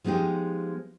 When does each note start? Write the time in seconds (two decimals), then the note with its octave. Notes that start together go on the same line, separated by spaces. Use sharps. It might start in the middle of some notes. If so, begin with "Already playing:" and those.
0.04 F3 G#3 B3 D#4 G4